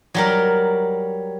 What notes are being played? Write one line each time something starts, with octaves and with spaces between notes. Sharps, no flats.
F#3 G3 A#4